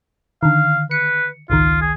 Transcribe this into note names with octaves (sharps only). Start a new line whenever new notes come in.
D3 D#3 F5
B4 C#7
G#1 C#2 D#3 F4
G#4